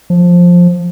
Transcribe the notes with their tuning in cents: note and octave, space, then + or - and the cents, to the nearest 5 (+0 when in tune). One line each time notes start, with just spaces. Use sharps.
F3 +10